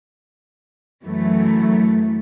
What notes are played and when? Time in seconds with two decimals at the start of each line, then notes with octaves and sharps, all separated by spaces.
1.03 F#2 E3 F#3 A3